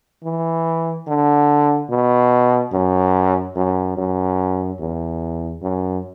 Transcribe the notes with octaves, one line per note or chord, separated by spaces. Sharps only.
E3
D3
B2
F#2
F#2
F#2
E2
F#2